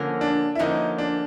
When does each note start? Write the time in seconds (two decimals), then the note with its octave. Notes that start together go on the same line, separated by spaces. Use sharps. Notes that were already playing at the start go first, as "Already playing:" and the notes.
Already playing: D3 F3 A#3 C#4
0.21 D4
0.55 E4
0.59 D3 F3 A#3 C#4 D#4
0.98 D4